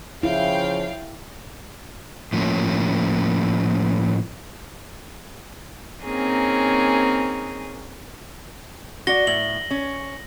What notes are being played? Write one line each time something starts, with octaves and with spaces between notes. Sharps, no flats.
C#3 F3 E4 F5 G5 C7
A2 F3 A#3 C#4
A#3 C4 C#4 D#4 G#4
F#4 D5 A#6 G7
A2 F#7
C#4